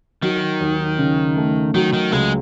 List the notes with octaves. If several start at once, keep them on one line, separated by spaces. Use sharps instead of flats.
D#3 F#3
D#2
C#3
A3
D#3 F#3
D#3
C#2 G#3